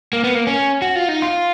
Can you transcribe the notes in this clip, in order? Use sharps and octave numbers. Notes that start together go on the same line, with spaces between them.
A#3
B3
A#3
C#4
F#4
F4
D#4
F4